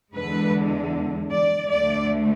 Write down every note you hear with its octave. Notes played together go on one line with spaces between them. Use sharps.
E2 D3 G#3 B4
D5
D2 D3 A3 D5